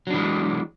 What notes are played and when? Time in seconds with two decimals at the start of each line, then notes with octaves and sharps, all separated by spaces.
0.07 F#3
0.10 D4
0.14 E3
0.18 G#3